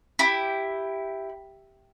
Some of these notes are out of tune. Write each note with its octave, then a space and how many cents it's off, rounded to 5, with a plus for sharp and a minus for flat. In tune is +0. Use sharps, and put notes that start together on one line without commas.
E4 +0 G4 +0